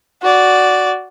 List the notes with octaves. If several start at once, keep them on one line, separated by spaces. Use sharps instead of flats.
F#4 D5